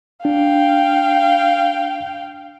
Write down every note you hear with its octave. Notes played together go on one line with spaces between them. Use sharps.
D4 F5 G5